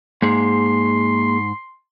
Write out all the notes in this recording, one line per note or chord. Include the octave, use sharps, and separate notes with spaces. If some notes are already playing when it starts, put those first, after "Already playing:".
G#2 A#3 G#4 C6